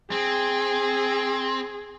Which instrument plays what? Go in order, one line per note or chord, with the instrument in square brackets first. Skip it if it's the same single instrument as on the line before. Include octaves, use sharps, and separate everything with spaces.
[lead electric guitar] C4 [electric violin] G#4